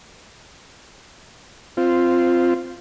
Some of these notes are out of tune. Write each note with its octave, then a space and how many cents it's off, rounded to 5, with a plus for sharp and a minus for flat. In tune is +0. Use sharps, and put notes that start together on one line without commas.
C4 +0 F4 -5